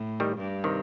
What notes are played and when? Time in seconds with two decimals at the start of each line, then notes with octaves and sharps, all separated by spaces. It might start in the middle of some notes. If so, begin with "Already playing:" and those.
Already playing: A2
0.20 D#3 G3
0.38 G2
0.64 C3 D#3